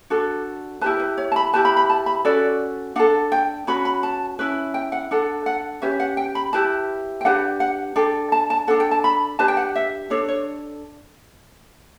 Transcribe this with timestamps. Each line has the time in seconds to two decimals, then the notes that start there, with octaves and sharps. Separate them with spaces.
0.10 D4 F#4 A4
0.81 E4 G4 B4 A5
1.00 B4
1.17 C#5
1.32 A5
1.36 B5
1.53 E4 G4 B4 A5
1.65 B5
1.77 B5
1.90 A5
2.06 B5
2.25 C#4 F#4 A4 D5
2.96 D4 A4 F#5
3.32 G5
3.67 C#4 F#4 B4 B5
3.85 B5
4.03 A5
4.39 C#4 E4 B4
4.74 G5
4.92 F#5
5.11 D4 A4 F#5
5.46 F#5
5.82 C#4 G4 B4 E5
6.00 F#5
6.17 G5
6.35 B5
6.53 E4 G4 B4 A5
7.21 G5
7.25 D4 G4 B4 F#5
7.60 F#5
7.96 D4 A4 G5
8.32 A5
8.50 A5
8.67 D4 A4 F#5
8.80 G5
8.91 A5
9.04 B5
9.39 D4 G4 B4 A5
9.48 G5
9.57 F#5
9.76 E5
10.10 D4 A4 C#5
10.28 C#5